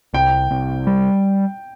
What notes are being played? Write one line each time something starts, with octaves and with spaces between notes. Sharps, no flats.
C2 G5
C2
G3